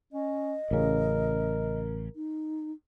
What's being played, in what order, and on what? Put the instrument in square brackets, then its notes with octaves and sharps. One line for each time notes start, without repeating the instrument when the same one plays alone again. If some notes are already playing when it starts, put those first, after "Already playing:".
[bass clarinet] C#4 [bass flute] D#5
[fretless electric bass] A1 C#3 [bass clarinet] A#4
[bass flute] D#4